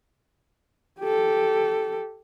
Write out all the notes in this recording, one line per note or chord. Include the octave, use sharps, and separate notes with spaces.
G4 A4